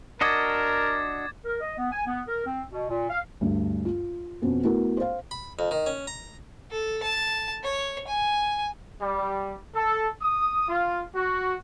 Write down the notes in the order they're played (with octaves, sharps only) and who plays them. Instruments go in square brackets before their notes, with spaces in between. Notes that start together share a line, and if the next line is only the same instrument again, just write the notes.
[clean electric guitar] D4 F#4 D#5 [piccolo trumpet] A#4 [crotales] D6 G#6 A6
[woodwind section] A#4
D#5
B3
G#5
B3
A#4
C4
B2
A#2
F5
[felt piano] D2 G2
F4
F2 B2 B3 C#4
A3 B3 E4 F#4 A#4
C5 F5
[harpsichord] B5
F2
D#3
C#4
A#5
[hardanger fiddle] A4
A5
C#5
G#5
[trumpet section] G3
A4
D#6
F4
F#4